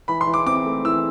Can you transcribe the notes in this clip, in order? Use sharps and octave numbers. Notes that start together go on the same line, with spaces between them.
E3 B5
C6
E3
D6
C4 D6
A3
E3 E6